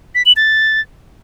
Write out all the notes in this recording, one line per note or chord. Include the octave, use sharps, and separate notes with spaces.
B6
F#7
A6